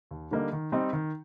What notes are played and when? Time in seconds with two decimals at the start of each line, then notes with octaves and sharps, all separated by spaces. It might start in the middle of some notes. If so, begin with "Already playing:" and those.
0.11 D#2
0.31 D3 G3 A#3 D#4
0.52 D#3
0.72 G3 C4 D#4
0.93 D#3